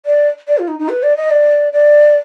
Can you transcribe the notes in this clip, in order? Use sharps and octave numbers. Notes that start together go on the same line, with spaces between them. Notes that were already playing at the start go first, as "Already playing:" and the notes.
D5
D5
F4
D#4
D#4
B4
D5
D#5
D5
D5